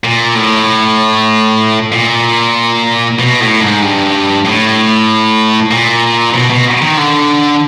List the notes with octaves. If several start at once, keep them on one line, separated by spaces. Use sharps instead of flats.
A#2
A2
A#2
B2
A2
G#2
G2
A2
A#2
B2
B2
D#3
D3